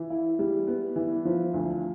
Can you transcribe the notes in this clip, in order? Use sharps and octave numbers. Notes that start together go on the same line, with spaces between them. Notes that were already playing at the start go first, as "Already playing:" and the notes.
Already playing: E3
E4
G3
B3
E3
F3
D2